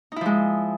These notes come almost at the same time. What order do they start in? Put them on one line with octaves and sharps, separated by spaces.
D#4 E4 F3 G#3